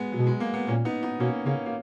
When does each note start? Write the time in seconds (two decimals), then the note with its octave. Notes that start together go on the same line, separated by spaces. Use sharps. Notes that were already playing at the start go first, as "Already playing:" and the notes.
Already playing: G#3 B3
0.12 B2 F#3
0.27 G#3
0.40 A#3
0.54 B3
0.67 A#2 A#3 C#4
0.85 B3 D#4
1.03 B3 D#4
1.20 B2 A#3 C#4
1.46 C#3 A#3 C#4
1.66 A#3